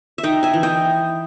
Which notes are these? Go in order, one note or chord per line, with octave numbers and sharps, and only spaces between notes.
E5
D#4 D#5 G5
E5 G#5
E3
D#5 G5